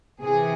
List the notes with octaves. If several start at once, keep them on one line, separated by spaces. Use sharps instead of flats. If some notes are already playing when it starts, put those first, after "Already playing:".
C3 E3 G#4